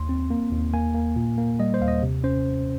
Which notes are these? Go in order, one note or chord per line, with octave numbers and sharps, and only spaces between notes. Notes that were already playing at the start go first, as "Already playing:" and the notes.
Already playing: D#2 C6
C4
A#3
D#2
A#3 G#5
A#3
A#2
A#3
G3 D#5
C5
D#2 F5
D#5
C3
C#4 C5